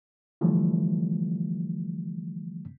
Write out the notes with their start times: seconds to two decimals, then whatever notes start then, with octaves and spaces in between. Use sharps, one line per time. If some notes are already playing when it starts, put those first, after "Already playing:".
0.41 D3 E3 F3 G3 A3